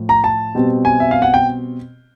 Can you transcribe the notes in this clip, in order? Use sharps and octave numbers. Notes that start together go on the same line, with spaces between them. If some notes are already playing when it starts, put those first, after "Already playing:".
Already playing: A2 F3
A#5
A5
B2 G3 C4
G#5
E5
F5
F#5
G5